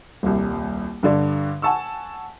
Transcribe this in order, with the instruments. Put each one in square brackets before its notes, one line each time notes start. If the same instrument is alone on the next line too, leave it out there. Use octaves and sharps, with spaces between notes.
[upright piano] D#1 C2
G2 D3 D5
F#5 G#5 A5 C#6 E6